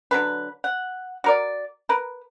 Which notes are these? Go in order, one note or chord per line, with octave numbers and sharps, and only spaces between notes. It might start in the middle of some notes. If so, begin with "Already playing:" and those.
D3 F#3 B4
F#5
F#4 A#4 D5
A#4 B4